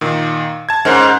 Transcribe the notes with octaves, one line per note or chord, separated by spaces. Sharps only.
A#2 D#3
A5 G#6
G#2 C#4 A#4 C5